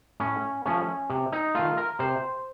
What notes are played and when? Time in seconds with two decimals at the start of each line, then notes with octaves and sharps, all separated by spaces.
0.20 A2 C#4
0.66 F3 A3 C#4
1.10 C3
1.32 D#4
1.55 D#3 A3 F4
1.77 A#4
1.99 C3 C5